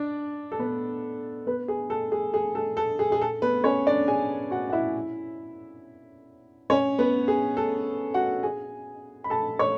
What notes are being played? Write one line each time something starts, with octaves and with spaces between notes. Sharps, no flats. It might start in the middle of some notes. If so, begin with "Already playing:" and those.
Already playing: D4 D5
A4
B3 B4
B3 B4
G#4
A4
G#4
G#4
A4
A4
G#4
G#4
A4
B3 B4
C#4 C#5
D4 D5
G#4 G#5
F#4 F#5
F#5
E4 E5
C#4 C#5
B3 B4
G#4
A4
F#4 F#5
G#4 G#5
B5
A4 A5
C#5 C#6